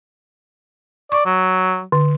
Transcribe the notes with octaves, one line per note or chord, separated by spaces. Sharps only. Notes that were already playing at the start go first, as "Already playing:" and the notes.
D5 C#6
F#3
D3